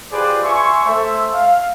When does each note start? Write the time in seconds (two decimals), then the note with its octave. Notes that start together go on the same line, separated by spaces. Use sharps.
0.12 F4 G4 G#4 B4 C5 D5
0.43 E5 G#5 C6 C#6
0.85 A3 A4 C5 E5
1.34 F5